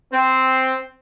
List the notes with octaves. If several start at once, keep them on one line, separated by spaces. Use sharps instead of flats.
C4